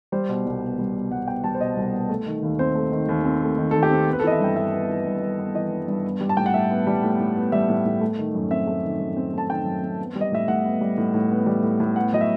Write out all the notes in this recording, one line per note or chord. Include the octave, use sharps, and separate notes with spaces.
G3 C5
B2
C2
B3
G3
B2
C2 F#5
B3 G5
G3 A5
C5
B2 D#5
C2
B3
A3
D#3
D#2
C4 C5
A3
D#3
D#2
C4
A3
D#3
D#2 A4
G4
C4
B3
B4
A4
E3 D#5
E5
G2 G5
G2 E5
B3
E3
G2
G2
B3
E3 D#5
G2
G2
B3
G3
A5
A2 G5
F#5
A2 E5
B3
G3
A2
A2
B3
G3 E5
A2
A2
A3
D#3
F#2
C4 E5
A3
D#3
F#2
C4
A3 A5
D#3 G5
F#2
C4
B3
G3
D#5
A2 E5
A2 F#5
B3
G3
A2
A2
B3
G3
A2
A2
B3 F#5
F#3 D#5
E5